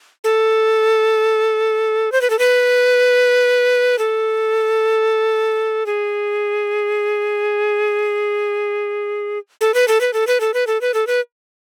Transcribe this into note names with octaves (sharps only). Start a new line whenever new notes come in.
A4
C5
B4
A4
B4
A4
G#4
A4
B4
A4
B4
A4
B4
A4
B4
A4
B4
A4
B4